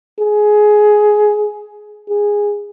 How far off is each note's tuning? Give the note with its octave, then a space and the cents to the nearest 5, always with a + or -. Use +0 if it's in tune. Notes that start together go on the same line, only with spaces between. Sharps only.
G#4 +15
G#4 -10